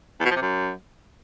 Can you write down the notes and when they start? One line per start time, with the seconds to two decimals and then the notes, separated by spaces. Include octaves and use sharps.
0.20 E2
0.25 B2
0.31 F3
0.36 C3
0.41 F#2